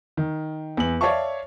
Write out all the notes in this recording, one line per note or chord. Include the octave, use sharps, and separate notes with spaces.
D#3
E2 F#7
C#5 D5 E5 F5 A5 C#6